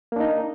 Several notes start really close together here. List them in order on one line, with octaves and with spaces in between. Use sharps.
A#3 D4 D#4